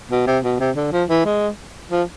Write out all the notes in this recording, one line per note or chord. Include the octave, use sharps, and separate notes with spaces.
B2
C3
B2
C3
D3
F3
E3
G#3
F3